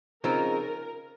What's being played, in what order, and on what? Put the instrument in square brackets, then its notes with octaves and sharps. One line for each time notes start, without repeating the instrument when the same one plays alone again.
[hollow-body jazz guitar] C#3 F3 C4 D#4 [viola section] A#4